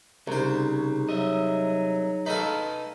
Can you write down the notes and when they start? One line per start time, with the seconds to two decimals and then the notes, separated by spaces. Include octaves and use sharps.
0.28 C2 C#3 D#4 G#4 C5 A#5
1.09 F#3 D#5 E5
2.26 D#4 A4 B4 D#5 F5